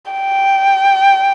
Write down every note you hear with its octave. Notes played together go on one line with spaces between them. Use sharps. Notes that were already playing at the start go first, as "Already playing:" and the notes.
G5